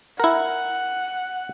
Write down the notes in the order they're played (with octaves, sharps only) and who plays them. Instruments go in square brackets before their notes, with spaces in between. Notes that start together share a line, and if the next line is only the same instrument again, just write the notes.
[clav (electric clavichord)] E4 A#4 [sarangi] F#5